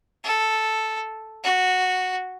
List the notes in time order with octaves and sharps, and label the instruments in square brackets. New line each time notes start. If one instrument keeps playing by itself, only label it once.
[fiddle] A4
F#4